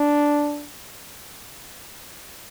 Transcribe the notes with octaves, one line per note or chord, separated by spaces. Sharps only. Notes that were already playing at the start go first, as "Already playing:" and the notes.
Already playing: D4